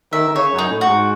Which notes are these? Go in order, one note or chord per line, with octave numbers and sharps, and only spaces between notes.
D#3 E5
D#3
C#3 C#5
F#2
D#4
A2
F#4
G#2